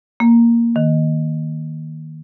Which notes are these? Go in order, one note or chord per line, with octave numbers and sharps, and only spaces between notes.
A#3
D#3